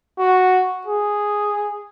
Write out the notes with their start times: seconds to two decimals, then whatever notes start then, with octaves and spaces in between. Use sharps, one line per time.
0.18 F#4
0.87 G#4